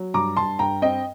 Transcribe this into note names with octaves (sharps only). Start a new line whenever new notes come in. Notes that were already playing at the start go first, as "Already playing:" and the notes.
Already playing: F#3
G2 A#5 D6
G2 A5 C6
G2 G5 A#5
C4 D#5 G5